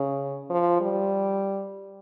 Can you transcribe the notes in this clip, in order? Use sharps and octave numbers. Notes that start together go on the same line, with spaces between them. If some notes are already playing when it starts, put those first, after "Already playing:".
Already playing: C#3
F3
G3